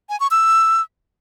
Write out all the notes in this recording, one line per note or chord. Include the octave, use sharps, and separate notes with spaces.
G#5
C#6
E6